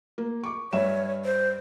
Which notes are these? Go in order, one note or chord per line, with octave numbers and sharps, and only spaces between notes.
A#3
C#6 D6
G2 C#5 E5 E7
C5